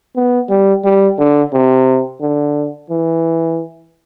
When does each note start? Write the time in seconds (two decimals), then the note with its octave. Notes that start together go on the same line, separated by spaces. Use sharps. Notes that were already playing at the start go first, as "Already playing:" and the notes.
0.16 B3
0.50 G3
0.84 G3
1.18 D3
1.53 C3
2.21 D3
2.90 E3